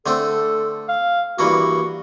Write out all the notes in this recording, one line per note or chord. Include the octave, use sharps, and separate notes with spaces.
D3 A3 C4 A4
F5
G2 E3 A#3 F#4